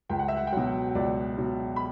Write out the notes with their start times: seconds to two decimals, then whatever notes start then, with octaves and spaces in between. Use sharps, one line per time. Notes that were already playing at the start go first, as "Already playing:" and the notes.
0.09 C#2 G5
0.19 F#5
0.28 E5
0.37 F#5
0.47 G5
0.52 B2 F#3 F#5
0.95 C#2 D5
1.38 B2 F#3
1.76 B5